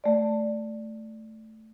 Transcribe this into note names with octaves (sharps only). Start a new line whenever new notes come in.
A3 D5